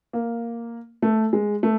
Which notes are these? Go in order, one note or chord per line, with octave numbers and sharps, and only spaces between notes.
A#3
A3
G#3
A3